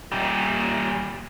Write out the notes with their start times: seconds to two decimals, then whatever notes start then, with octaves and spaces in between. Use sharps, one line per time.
0.12 A#2 G3